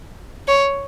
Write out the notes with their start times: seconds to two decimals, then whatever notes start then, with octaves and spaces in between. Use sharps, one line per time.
0.48 C#5